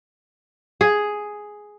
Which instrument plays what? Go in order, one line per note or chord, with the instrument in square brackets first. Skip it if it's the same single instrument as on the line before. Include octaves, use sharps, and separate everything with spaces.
[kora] G#4